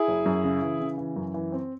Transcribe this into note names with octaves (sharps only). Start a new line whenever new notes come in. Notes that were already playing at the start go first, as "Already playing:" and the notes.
Already playing: E4 G#4
F#1
F#2
C#3
E3
C#3
E3
F#2
E3
C4